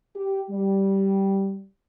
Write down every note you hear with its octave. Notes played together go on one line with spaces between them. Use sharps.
G4
G3